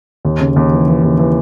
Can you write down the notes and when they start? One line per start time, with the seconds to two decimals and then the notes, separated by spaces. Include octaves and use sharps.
0.25 D#2
0.40 C#3
0.56 D#2
0.72 E3
0.88 E3
1.03 D#2
1.19 E3